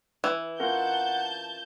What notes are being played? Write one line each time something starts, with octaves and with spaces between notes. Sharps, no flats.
E3
C#4 F4 A#4 F#5 A5 G6